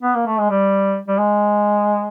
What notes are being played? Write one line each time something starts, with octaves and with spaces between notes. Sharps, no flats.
B3
A#3
A3
G#3
G3
G3
G#3